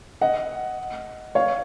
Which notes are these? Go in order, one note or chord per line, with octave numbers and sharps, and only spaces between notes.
D#5 F#5
C#5 F5